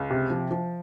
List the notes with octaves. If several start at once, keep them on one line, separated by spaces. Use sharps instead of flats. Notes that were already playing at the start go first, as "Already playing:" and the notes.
Already playing: C#2
C3
F3
F3